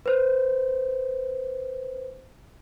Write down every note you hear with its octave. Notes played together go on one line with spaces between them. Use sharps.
B4 C5